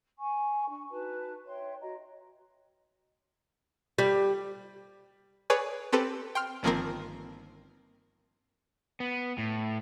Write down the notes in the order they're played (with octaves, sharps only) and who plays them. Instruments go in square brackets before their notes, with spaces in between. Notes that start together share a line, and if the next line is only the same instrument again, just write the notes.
[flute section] G#5 C#6
D4 C#6
D#4 F#4 B4 A5
C#5 E5 G5 C6
F#4 D#5 A#5
[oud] G3
[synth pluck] G#4 B4 C#5 D5 G#5
C4 G4 A4 B4
G5 C6 F6
G1 D#3 F3 A#3 C4 A#4
[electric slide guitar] B3
A2